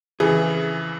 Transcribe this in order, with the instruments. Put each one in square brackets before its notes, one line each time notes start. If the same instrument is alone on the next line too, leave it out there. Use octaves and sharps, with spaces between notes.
[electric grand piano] F2 C#3 E3 [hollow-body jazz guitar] G#4